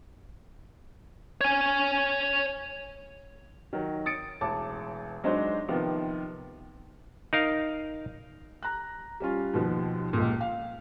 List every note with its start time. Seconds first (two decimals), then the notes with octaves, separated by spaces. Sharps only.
1.41 C#5 G#5
3.73 D#3 F#3
4.06 D#6 A6 C#7 D7
4.41 E1 A1 A5 D6
5.24 F#3 G#3 D4 D#4 C5
5.68 C3 D#3 F3 B3
7.33 D#4 A#4 F5
8.63 A#5 F#6
9.20 G3 C#4 F4
9.54 D#2 B2 F3
10.13 C#2 A#2
10.41 F5